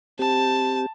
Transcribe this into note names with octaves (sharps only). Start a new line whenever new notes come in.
C4 G4 A5